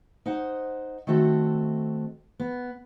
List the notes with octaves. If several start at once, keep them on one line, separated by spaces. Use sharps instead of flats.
D#4 C5 F#5
D#3 A3 C4 F#4 A4
B3